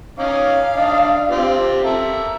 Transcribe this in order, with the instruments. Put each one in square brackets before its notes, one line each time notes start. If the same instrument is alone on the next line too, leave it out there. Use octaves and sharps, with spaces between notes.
[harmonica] C#4 D#4 D6 [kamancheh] F5
[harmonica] D3 D4 D#5
C4 F4 G4
A4 A#4 E5